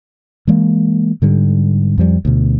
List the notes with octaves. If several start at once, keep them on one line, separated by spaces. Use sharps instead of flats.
E3 G#3 A#3
G#2 D3 G3
F2 F3 G3
D2 B2